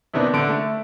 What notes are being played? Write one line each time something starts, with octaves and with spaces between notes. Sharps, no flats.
C3 D#3 B3 D4 D#4 B4
D3 D7
A3